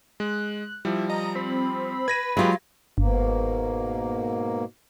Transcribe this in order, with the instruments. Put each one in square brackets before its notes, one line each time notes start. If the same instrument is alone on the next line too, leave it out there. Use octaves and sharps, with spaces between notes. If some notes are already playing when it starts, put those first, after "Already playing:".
[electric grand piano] G#3 [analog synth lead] F#6
[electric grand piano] F3 G3 [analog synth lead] E4
[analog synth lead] D#5 [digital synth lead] A#5
[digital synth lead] C4 [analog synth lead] B5
[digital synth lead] B4 [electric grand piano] G#6 A#6 D#7
[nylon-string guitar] F#3 F4 [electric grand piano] G#3 G4 [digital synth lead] B4
[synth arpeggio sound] G1 [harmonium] G#2 B2 A#3